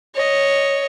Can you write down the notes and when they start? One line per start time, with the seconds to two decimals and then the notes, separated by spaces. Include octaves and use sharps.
0.15 C#5 D#5